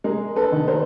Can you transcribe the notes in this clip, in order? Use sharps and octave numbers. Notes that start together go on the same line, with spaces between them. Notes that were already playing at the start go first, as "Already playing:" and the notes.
G#3 G#4 A#4
A4 B4
D#3
A#4 C5